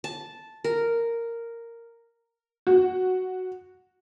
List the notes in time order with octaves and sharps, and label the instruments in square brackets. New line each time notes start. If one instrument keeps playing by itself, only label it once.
[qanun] A5
A#4
[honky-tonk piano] F#4